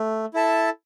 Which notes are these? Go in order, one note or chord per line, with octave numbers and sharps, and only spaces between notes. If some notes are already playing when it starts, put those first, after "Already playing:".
Already playing: A3
E4 A4 E5 A5